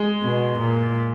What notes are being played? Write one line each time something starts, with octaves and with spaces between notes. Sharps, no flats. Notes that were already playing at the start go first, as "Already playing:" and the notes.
Already playing: G#3
B2
A#2